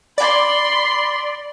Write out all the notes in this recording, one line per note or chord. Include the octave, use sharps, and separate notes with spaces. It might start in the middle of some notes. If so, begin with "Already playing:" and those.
D5 B5 C6